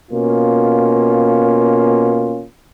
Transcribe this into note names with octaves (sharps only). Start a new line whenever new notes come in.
B2 A#3 C#4 F4